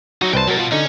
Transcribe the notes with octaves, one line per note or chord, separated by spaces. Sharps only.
F#3 D#4 E4 F#4
C2 B4 C5 G5 A5
B2 F#3 A#4
F4
D3 C#4 D#4